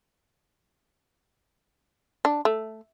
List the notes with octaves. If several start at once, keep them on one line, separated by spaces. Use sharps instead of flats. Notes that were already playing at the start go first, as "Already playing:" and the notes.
D4
A3